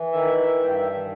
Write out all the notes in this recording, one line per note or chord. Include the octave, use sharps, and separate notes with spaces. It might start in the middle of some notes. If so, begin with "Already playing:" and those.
Already playing: E3
D#3 E5
E5
G2 G5
E5